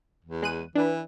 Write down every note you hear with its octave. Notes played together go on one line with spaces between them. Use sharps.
E2
G#3 F#6 D#7
E3 D4 B4